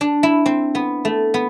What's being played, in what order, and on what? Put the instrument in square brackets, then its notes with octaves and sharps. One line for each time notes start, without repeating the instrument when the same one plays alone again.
[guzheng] D4
E4
C4
B3
A3
B3